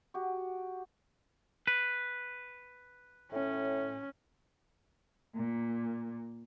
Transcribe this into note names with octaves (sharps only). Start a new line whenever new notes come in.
F#4 G4
B4
A2 C#4
A#2